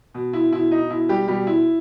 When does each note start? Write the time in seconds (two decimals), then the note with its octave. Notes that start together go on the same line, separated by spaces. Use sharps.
0.14 B2
0.33 E4
0.52 B2 E4
0.71 D#4
0.90 B2 E4
1.09 G3 G4
1.28 B2 G3 G4
1.47 E4